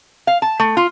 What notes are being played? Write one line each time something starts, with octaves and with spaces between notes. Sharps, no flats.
F5
A5
A3
F4